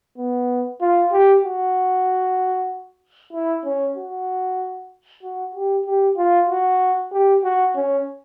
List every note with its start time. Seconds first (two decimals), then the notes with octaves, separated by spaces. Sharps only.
0.18 B3
0.81 F4
1.12 G4
1.44 F#4
3.33 E4
3.65 C#4
3.97 F#4
5.23 F#4
5.55 G4
5.86 G4
6.18 F4
6.49 F#4
7.12 G4
7.44 F#4
7.76 C#4